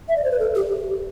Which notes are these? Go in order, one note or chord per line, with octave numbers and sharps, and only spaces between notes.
E5
D5
C5
B4
A4
G4